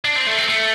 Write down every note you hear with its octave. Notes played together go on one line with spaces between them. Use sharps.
D4
C4
A3
C4
A3